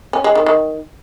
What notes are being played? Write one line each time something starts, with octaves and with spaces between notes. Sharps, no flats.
C#4
G#3
D#3
D#3